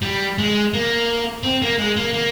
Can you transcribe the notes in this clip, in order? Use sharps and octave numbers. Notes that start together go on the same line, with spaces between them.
G3
G#3
A#3
C4
A#3
G#3
A#3
A#3